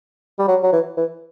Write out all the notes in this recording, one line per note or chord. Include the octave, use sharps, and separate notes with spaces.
G3
F#3
F#3
E3
E3